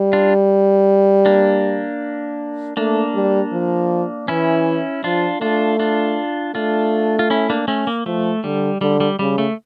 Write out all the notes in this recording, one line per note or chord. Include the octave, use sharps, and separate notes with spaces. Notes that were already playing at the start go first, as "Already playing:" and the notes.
Already playing: G3
D4 F4
A#3 D4
A3 A#3 D4
G3
F3
E3 C#4 E4
F3 D4 F4
A3 D4 F4
D4 F4
A3 D4 F4
F4
C#4 E4
A#3 D4
A3 C#4
A#3
F3 A3
D3 G3
D3 G3
G3
C#3 G3
A3